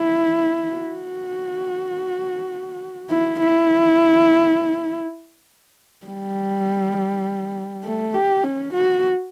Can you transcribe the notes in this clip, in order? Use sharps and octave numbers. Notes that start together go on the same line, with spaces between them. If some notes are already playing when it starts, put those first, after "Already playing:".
Already playing: E4
F#4
E4
E4
G3
A3
G4
C#4
F#4